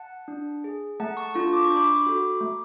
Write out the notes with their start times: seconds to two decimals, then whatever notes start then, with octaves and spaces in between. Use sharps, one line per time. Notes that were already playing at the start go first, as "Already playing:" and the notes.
Already playing: F#5 A5
0.28 D4
0.64 G#4
1.00 A3 F#5 A5
1.17 A5 C#6
1.34 D4 F4 A4 A5 C#6
1.53 D6
1.65 C#6
1.70 D4
1.76 B5 D6
2.06 F#4 A4
2.41 A3